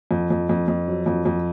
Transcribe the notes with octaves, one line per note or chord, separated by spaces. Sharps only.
F2
F2
F2
F2
F#3
F2
F2